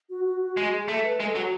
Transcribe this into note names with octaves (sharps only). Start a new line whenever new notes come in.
F#4
F#4
F#4
G#3 F#4
G#4
A3 A4
B4
G#3 A4
F#3 F#4